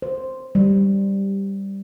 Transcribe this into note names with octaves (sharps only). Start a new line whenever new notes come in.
C5
G3